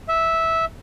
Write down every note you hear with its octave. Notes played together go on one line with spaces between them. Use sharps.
E5